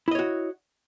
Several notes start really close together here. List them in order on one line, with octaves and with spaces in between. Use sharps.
E4 D#5 C#5 F#4